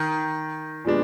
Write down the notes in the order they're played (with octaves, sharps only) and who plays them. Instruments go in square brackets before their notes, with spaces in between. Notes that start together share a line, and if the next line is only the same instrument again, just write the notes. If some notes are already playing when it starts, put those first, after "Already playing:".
Already playing: [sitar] D#3
[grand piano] A#2 F3 G#3 B3 D4